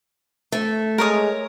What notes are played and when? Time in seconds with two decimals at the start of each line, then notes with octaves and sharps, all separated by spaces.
0.52 A3
0.98 G#3 A#4 C#5 D#6